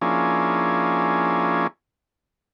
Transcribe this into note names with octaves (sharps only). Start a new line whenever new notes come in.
F3 A#3 C#4 D4 E4 G#4